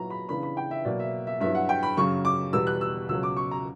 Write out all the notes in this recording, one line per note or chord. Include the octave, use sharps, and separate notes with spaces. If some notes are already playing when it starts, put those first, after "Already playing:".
Already playing: A#2 F#3 B3 E4 A#5
B5
C#3 E3 B3 D4 B5
B5
G5
E5
B2 F#3 A#3 D5
E5
E5
G2 F#3 B3 E4 E5
F#5
G5
B5
F#2 C#3 F#3 C#6
D6
E2 B2 G3 B3 E6
F#6
E6
C#2 B2 F#3 C#4 E6
D6
C#6
A#5